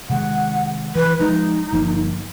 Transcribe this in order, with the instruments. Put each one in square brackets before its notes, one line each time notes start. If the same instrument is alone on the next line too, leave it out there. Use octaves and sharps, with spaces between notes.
[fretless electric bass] C3 D#3 G#3 [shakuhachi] F#5
[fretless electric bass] E3 [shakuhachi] B4
[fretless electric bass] F3 G#3 [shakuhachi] D#4
[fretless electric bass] G1 F3 A#3